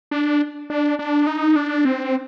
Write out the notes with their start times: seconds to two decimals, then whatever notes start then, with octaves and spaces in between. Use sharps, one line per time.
0.11 D4
0.70 D4
0.99 D4
1.27 D#4
1.56 D4
1.85 C4